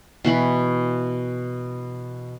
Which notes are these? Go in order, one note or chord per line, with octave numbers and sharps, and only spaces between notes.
B2 E3 F#4 B5